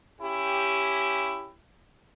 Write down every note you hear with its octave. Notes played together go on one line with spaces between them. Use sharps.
C#4 E4 G4